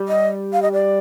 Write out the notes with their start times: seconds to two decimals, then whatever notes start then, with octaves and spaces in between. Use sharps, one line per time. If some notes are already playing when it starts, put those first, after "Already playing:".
Already playing: G3
0.08 D#5
0.53 F5
0.62 D#5
0.72 D5